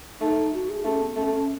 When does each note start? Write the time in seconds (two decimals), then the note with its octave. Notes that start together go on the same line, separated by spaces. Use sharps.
0.21 A3 D#4
0.53 F#4
0.70 G#4
0.85 A3 C#4
1.01 B3
1.16 A3 C#4
1.33 C#4